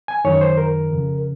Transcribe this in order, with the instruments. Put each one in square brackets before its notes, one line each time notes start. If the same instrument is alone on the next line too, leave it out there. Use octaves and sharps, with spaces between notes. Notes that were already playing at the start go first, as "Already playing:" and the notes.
[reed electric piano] G#5
F#2 D#3 C#5
C5
A#4
F2 C#3